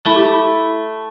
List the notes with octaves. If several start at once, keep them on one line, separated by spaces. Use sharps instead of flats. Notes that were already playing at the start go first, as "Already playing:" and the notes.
A3 E4
G4
E4